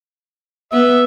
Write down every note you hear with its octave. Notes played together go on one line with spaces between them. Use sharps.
B3 E5